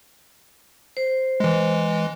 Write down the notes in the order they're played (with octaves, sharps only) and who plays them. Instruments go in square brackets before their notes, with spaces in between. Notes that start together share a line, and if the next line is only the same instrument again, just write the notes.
[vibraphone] C5
[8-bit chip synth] E3 G#3